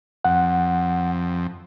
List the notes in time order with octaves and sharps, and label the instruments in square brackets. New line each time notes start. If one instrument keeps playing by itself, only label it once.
[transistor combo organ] F2 [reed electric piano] F#5